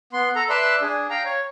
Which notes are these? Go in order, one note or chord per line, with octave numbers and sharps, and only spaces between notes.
B3 C6
A4 A#5
B4 D5 E5 A5 C6 E6
D4 G#4
F5 G5 A#5
C#5